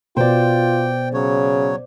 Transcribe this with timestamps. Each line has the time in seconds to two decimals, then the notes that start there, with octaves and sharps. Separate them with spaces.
0.17 B2 F4 C5 D5 G5
1.14 C#3 F#3 C#5